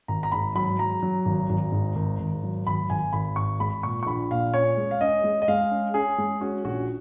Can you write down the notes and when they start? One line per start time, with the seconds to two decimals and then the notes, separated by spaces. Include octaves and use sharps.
0.08 G#1 A#5
0.23 A#5
0.32 G#2 B5
0.55 F#3 B5
0.79 F#3 A#5
1.03 F#3
1.25 G#1
1.49 G#1
1.72 G#2
1.95 G#1
2.19 G#1
2.43 F#3
2.67 G#1 B5
2.90 G#1 G#5
3.13 G#1 B5
3.36 G#2 C#6
3.60 G#3 B5
3.83 A#2 C#6
4.03 C#6
4.06 A#1 B5
4.31 A#2 F5
4.54 C#4 C#5
4.77 G#3
4.91 F5
5.01 C#4 D#5
5.24 G#3
5.42 D#5
5.48 G#3 F5
5.71 C#4
5.94 C#4 G#4
6.18 G#3
6.41 C#4 F#4
6.64 A#1 F#4